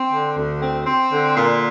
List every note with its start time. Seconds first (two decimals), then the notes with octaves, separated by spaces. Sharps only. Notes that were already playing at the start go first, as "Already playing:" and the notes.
Already playing: C4
0.11 D3
0.36 D2
0.61 C4
0.86 C4
1.12 D3
1.37 A#2